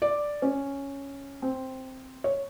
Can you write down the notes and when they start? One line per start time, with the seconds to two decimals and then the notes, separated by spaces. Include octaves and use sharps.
0.02 D5
0.42 C#4
1.42 C4
2.24 C#5